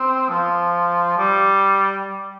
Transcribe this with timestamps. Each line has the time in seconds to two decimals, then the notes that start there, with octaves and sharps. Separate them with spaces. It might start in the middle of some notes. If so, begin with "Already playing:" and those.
Already playing: C4
0.29 F3
1.18 G3